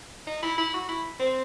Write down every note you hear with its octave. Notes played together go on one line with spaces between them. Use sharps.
D#4
E4
E4
F#4
E4
C4